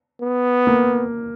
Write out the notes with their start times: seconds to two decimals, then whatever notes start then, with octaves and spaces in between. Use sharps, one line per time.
0.21 B3
0.67 A#3